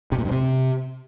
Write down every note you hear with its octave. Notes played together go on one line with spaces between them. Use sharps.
C3
A#2
G2
C3